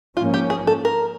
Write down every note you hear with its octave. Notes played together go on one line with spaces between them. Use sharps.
G#2 F3 A#3 C#4 F4
G4
G#4
A4
A#4